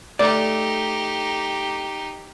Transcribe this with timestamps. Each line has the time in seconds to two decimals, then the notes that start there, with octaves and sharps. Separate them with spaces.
0.19 A3 D#4 G4 D5